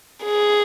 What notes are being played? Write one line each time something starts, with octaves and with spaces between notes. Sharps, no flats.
G#4